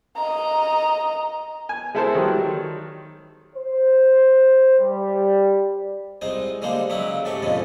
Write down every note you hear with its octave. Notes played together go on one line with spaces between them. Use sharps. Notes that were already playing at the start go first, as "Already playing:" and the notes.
D#5 A#5
G#5
G#3 E4 A4 A#4 C5
D#3 F#3 G3
C5
G3
C2 G#3 D#4 C5
D3 D#3 G3 G#3 A#3 C5
C#3 F#3 D#4 E4
G#2 C#3 A3 G4 C#6
F2 G#2 B2 D3 D#3 C#4